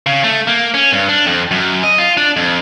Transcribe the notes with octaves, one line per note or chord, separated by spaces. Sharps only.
C#3
A3
A#3
C#4
G2
D4
F2
F#2
D#5
F4
D4
F2